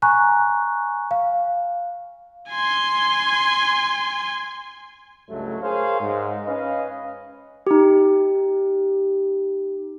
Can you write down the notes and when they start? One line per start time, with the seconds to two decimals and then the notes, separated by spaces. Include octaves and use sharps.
0.02 G#5 A#5 C#6 F#6
1.11 F5
2.50 G#5 C6
5.28 C#2 G2 F#3 A3
5.62 G#4 A#4 C5 C#5 F5
6.00 G#2
6.46 C#4 B4 D#5 F5
7.67 D#4 G4